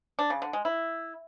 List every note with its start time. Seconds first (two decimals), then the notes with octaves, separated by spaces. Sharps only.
0.19 D4
0.30 C#3
0.42 D3
0.53 G#3
0.65 E4